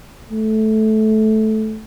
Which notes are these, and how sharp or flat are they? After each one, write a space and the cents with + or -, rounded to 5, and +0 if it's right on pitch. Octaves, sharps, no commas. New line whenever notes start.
A3 -15